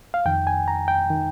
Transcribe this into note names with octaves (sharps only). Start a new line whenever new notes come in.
F5
F2 D#3 G5
G#5
A#5
G5
D#3